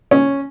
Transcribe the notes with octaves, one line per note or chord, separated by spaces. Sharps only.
C#4